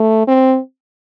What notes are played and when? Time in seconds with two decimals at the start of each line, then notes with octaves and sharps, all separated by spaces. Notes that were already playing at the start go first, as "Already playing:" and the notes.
Already playing: A3
0.27 C4